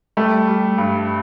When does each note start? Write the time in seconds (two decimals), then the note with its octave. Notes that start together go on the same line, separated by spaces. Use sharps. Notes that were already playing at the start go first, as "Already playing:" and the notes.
0.17 G3 A3
0.48 G3
0.78 G2